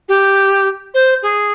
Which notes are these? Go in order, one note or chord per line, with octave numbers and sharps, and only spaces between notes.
G4
C5
G#4